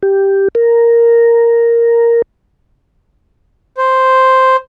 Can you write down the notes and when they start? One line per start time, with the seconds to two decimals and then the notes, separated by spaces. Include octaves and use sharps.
0.03 G4
0.55 A#4
3.77 C5